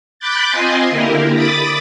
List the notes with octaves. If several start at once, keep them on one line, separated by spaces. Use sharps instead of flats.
B5 D6 F#6 G6 A6
C4 F4 D#5 G#5 C6
D3 A#3 E4 G4 A#4
B5 D6 D#6 A6